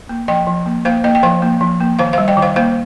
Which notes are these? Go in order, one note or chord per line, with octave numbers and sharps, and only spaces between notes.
A#3
F3 D#5 G5
F3
A#3
A#3 C5 F5
A#3 D#5 G5
G5
F3 C5 F5
A#3
F3
A#3
D#3 C5 F5
C5 F5
G3
D#5 G5
D#3
C5 F5
A#3 C5 F5